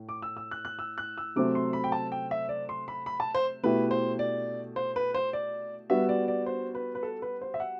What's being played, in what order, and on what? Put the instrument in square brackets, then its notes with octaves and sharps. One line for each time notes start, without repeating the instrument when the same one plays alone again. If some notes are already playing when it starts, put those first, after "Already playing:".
Already playing: [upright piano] A2
[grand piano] D6
E6
E6
F#6
F#6
E6
F#6
E6
[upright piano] C3 F#3 A3 C4 [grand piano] D6
[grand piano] C6
B5
G5
A5
G5
E5
D5
C6
B5
B5
A5
C5
[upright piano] B2 A3 E4 G4 [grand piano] B4
[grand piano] C5
D5
C5
B4
C5
D5
[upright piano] G3 B3 F#4 [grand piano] E5
[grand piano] D5
D5
C5
B4
B4
A4
B4
C5
E5
F#5